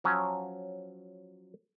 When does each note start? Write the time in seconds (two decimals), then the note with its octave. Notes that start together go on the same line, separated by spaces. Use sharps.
0.04 F3 F#3 C#4